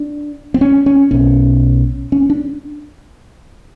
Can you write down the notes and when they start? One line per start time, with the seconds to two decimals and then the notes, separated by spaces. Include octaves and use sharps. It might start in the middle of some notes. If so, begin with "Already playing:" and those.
Already playing: D4
0.54 C4
0.61 C#4
0.86 C#4
1.11 B1 B2 C#4
2.12 C#4
2.30 D4